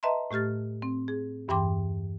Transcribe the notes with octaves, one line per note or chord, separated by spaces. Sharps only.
B4 D#5 E5 A5 A#5 C6
A2 A3 G4 F6 A6
C4
G#4
E2 G2 E3 G5 C6 D6